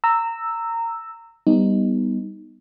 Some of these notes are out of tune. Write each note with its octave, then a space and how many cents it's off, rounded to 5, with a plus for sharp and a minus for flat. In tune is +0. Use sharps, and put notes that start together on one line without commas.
A#5 -20 E6 +0
G3 +0 B3 +0 D#4 +0